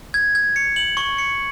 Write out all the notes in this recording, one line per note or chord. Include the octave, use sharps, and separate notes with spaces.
G#6
G#6
C#7
F#7
C#6
C#7